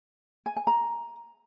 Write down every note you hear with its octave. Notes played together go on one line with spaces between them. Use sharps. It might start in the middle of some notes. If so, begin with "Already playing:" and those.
G#5
G#5
A#5